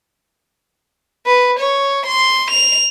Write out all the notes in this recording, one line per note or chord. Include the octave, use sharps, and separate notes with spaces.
B4
C#5
C6
F7